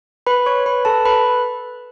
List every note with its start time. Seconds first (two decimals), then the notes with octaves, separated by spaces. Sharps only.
0.27 B4 B5
0.46 C#5 C#6
0.66 B4 B5
0.85 A4 A5
1.05 B4 B5